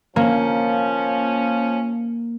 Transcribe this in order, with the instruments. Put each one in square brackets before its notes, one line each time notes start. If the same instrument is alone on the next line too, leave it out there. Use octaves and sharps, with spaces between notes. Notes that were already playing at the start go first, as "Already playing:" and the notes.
[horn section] F3 C#4 [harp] A#3